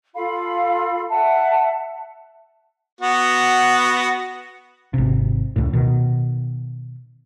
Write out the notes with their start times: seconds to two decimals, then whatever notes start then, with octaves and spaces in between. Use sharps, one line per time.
0.15 F4 A4 F5 B5
1.09 E5 F#5 A5
3.01 B3 F#4
4.94 G#1 C3
5.56 C#2 A2
5.73 B2 D#3